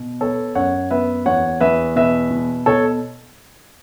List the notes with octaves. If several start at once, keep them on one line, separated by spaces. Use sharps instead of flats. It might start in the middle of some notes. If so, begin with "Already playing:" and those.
Already playing: B2
B3 A4 C#5
F#2 C#5 F#5
B3 B4 E5
E2 C#5 F#5
E2 B4 E5
B2 B4 E5
B2
B2 A4 C#5